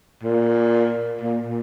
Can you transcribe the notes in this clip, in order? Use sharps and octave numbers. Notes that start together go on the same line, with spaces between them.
A#2
A#2
A#2